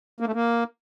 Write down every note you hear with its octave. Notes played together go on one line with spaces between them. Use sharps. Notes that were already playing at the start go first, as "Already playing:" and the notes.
A#3
A3
A#3